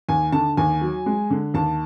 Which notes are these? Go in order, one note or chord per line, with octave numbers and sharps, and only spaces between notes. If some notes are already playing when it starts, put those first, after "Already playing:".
D#2 G#5
D3 A5
D#2 G#5
F#3
G#3
D3
D#2 A5